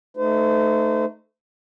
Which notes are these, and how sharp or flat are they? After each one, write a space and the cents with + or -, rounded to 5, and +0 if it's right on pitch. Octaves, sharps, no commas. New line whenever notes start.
A3 +0 D#4 -10 C5 -35